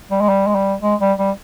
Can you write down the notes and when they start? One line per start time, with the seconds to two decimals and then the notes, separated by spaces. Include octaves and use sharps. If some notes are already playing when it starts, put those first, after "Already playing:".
0.11 G3
0.21 G#3
0.29 G3
0.47 G#3
0.55 G3
0.82 G#3
1.00 G3
1.18 G3